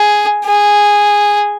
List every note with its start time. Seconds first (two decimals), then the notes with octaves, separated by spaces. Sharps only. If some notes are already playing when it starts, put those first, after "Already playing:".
Already playing: G#4
0.45 G#4